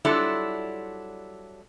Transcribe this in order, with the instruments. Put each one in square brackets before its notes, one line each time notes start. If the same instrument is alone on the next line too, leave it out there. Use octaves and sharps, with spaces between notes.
[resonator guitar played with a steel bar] F#3 G3 D4 E4 F4 A4